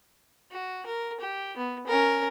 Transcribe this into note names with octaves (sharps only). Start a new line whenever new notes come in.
F#4
A#4
G4
B3
C#4 A#4